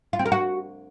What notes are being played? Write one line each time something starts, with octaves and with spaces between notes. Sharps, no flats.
F4
C4
A#4
F#4